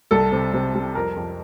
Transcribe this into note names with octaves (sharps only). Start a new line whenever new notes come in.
C2 A4
C3
C3
G3
F2 A#4
F2